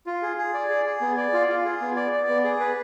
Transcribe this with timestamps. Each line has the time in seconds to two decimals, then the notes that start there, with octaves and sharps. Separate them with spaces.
0.06 F4
0.22 G#4
0.38 G#4
0.54 D5
0.70 G#4
0.86 G#4
1.01 B3
1.17 D5
1.33 F4
1.49 F4
1.65 G#4
1.81 B3
1.96 D5
2.12 D5
2.28 B3
2.44 G#4
2.60 B4